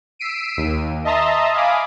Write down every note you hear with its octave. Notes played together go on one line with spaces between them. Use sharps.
E6 B6 C7 D7 D#7
D#2
D#5 E5 A5 A#5 C6 D#6
F5 G#5 B5 D6 D#6